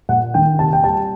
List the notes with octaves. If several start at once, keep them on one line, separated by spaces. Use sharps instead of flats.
A#2 F#5
D#3 G5
C3 A5
G5
G3 A5